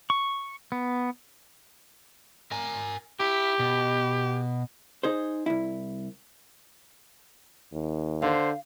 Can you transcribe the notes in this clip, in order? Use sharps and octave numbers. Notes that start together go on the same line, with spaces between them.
C#6
B3
A#4 G#5
E4 G4
B2
D#4 G#4 C5
C2 E4
D#2
D3 C5 F5